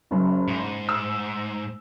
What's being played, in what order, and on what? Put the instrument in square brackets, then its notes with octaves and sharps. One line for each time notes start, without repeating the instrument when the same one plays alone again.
[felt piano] F#1 F#2
[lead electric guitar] G#2
[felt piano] E6